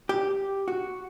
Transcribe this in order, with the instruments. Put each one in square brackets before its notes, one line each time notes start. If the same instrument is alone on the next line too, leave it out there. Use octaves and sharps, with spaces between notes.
[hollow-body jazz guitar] G4
F#4